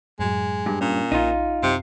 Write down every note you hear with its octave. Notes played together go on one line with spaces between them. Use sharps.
F#2 A2 F#3 G#3
G2
A#2 C#4
A#1 D#4 F4
F#2 C3 C7